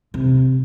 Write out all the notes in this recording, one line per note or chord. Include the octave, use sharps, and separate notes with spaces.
C3